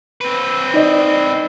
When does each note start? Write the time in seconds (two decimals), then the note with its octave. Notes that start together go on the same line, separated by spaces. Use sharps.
0.21 C4 B4
0.74 D#4 D5 D#5